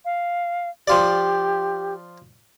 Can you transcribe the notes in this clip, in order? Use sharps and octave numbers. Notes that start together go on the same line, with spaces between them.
F5
F3 F4 G4 D5